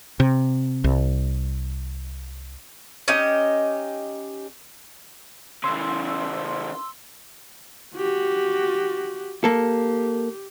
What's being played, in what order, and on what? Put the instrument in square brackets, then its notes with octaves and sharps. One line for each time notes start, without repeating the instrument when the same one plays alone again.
[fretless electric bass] C3
C2
[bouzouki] C#4 D#4 G4 D#5
[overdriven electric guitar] C#3 E3 [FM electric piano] C6 E6
[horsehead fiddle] F#4 G4
[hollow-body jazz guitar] A#3 A4 [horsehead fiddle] G4